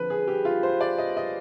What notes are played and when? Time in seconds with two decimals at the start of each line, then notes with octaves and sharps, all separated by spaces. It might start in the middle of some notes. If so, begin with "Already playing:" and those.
Already playing: D3 F3 C4 B4
0.10 G#4
0.28 G4
0.45 F4
0.63 C5
0.81 D5
0.98 D#5
1.17 D#5